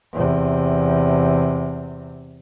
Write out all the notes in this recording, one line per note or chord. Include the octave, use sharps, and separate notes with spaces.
E2 C3